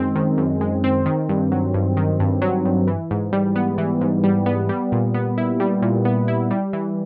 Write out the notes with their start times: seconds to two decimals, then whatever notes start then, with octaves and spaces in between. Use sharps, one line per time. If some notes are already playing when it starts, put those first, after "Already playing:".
Already playing: F#2 D#3 G#3 C4
0.15 D#3
0.38 F#2
0.61 G#3
0.84 C4
1.06 D#3
1.29 G2
1.52 F#3
1.74 G2
1.97 D#3
2.20 G2
2.42 F#3
2.65 G2
2.87 E3
3.11 G#2
3.33 G3
3.56 B3
3.78 E3
4.01 G#2
4.24 G3
4.46 B3
4.69 G3
4.92 A#2
5.14 B3
5.38 E4
5.60 G3
5.82 A#2
6.05 B3
6.28 E4
6.51 G3
6.73 E3